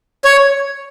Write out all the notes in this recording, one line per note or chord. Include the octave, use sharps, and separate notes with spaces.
C#5